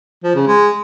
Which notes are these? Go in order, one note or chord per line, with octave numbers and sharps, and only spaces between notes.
F3
C#3
G#3